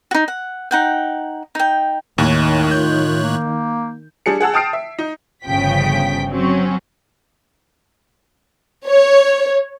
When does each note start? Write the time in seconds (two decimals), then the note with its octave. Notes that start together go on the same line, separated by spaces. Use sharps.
0.11 D#4 F#4
0.28 F#5
0.71 D#4 F#5 G5
1.55 D#4 G5
2.18 D#2 A2 D#3 C#5 F#6
2.71 F4 G6
3.23 A#3
4.26 G3 D4 G#4 C#7
4.40 G#4 F#5 A5 E6
4.54 G5 A5 D#6 F6 C7 D7
4.73 E5
4.99 D#4
5.45 G1 C#3 F3 G5 B6
6.30 F#3 C4 C#4
8.87 C#5